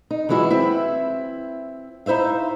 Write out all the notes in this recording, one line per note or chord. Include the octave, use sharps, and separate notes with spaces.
D#4
E3 F#3 G#3 E4 F#4
C4 E4
D#4 E4 C5 E5 F5